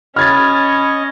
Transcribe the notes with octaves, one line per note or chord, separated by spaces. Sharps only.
C#4 D#5 B5 F6 G#6 A6